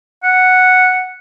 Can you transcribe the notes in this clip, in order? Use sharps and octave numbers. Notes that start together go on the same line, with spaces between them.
F#5